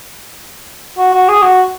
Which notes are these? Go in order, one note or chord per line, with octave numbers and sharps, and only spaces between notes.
F#4
F#4
G#4
F#4